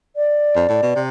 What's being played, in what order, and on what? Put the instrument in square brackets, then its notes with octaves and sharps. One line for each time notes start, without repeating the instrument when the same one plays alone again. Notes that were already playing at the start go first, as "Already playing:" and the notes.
[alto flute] D5
[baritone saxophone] F2
A2
B2
C3